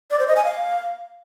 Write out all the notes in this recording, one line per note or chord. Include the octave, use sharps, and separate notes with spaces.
D5
C5
D#5
G#5
F5